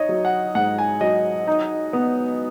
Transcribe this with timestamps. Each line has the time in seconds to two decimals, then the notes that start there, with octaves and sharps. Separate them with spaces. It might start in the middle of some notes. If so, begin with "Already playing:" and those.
Already playing: D#4 C#5 D#5
0.09 F#3
0.25 F#5
0.55 G#2 F#5
0.78 G#5
1.01 F#3 D#5
1.47 D#4
1.93 B3